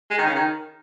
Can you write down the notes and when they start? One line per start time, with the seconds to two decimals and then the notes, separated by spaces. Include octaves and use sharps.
0.11 G#3
0.18 D#3
0.26 C#3
0.35 D#3